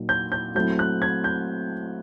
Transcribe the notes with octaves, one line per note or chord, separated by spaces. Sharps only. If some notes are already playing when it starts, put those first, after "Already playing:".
Already playing: A#2 F#3 A#3 D#4
G6
G6
F#3 A3 C4 E4 G6
F#6
G#6
G6